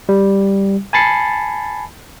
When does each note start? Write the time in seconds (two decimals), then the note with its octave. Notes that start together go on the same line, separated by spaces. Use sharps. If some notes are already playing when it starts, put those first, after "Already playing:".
0.09 G3
0.93 G#5 A5 B5 A6 C7 C#7